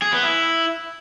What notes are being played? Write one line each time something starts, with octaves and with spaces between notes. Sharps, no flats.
G#4
B3
E4